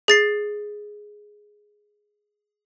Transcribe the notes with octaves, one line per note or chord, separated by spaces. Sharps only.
G#4 A6 C7